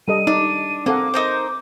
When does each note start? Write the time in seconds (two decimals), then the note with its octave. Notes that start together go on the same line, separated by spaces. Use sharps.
0.08 G3 A4 D#5 D#7
0.27 D4 D#4
0.86 A#3 C4 A4 F#5 D6
1.14 D#4 A#4 C5